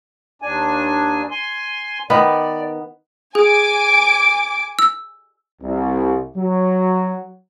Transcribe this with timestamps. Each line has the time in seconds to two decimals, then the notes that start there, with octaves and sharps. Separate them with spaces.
0.42 D#2 D4 G#5
1.31 G#5 C6
2.10 D#3 B3 B4 D5
3.35 G#4 G#5 D6 D7
4.79 E6
5.62 C2
6.37 F#3